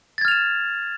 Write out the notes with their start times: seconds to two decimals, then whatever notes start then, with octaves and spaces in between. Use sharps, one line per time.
0.18 A6
0.21 G#6
0.25 F6
0.28 F7
0.31 E7